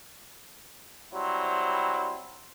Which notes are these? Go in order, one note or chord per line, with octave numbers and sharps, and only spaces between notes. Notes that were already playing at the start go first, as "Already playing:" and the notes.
F#3 G3 C4 E4 C5